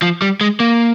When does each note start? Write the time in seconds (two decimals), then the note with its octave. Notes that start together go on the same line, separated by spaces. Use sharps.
0.02 F3
0.22 G3
0.41 G#3
0.60 A#3